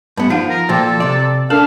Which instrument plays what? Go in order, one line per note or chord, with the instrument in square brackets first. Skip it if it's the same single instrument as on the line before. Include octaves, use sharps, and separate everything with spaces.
[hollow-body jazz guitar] G2 B3
[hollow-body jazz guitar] F3 [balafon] D#4 F5 F#5
[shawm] A#4
[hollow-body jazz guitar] A#2 F3 [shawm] A4 [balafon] C5 G5 D6
[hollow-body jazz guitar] C3 D5
[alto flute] D4 [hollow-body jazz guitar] A4 [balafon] A#4 [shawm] F5